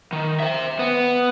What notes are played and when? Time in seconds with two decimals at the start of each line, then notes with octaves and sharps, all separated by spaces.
0.13 D#3
0.40 C5 E5
0.79 B3